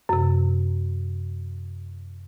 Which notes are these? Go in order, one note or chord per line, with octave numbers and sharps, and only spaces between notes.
F#2 C3